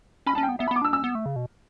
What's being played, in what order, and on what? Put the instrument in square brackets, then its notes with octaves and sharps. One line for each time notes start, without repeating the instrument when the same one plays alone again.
[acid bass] C#4 [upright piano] B5
[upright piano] A5
[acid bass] C#4
[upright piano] G5
[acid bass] B3
[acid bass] B3 [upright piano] E5
[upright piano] B5
[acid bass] B3 [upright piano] D6
[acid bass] D4 [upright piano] E6
[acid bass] C#4 [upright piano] E6
[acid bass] B3
A3
C#3
B2